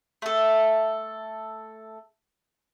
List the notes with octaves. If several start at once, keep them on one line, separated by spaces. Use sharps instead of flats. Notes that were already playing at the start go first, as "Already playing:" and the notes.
A3 A4